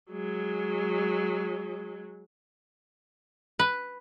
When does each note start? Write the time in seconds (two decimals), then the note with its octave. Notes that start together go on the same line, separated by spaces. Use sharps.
0.11 F#3 G#3
3.59 B4